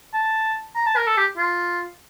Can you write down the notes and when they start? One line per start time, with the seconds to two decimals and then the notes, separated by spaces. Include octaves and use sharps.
0.13 A5
0.75 A#5
0.86 A5
0.96 A#4
1.07 A4
1.17 G4
1.37 F4